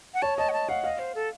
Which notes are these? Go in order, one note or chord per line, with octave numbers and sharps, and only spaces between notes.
F#5
C#5 A5
D#5 A5
F#5
A5
F5 F#5
D#5 F5
C5
A4